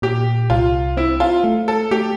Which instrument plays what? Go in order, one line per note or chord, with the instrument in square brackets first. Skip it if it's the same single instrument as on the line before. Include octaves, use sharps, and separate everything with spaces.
[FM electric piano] A#2 [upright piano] G4
[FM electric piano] C2 [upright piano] F4
[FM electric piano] C4 [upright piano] E4
[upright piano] F4
[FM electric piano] A3
[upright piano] A4
[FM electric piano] A3 [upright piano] G4